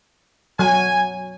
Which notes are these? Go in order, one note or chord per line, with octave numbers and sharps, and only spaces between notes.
F#3 G#5